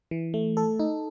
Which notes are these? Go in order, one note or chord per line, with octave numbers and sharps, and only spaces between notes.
E3
A3
A4
D#4